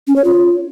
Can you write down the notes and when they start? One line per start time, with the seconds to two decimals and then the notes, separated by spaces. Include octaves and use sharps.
0.07 C#4
0.16 C#5
0.24 F4